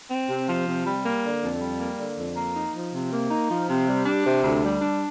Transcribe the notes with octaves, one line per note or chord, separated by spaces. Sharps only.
C4
C3
F3
C3
G3
A#3
D3
F2
G3
A#3
D3
F2
A#3
D#4
F3
C3
A#3
D#4
F3
C3
G3
D4
C3
D2
G3
D4